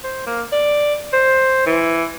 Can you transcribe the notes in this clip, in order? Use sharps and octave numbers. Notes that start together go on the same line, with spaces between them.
C5
A#3
D5
C5
E3